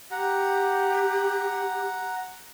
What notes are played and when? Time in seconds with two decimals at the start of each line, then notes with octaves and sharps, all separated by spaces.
0.11 G4 F#5 A#5